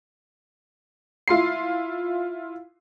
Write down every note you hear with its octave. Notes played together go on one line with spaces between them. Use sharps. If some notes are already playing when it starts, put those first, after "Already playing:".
E4 F4 C6 C7